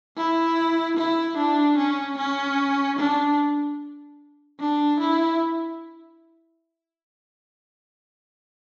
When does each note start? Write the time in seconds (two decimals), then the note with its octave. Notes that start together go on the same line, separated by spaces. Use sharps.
0.17 E4
0.97 E4
1.37 D4
1.78 C#4
2.18 C#4
2.99 D4
4.60 D4
5.00 E4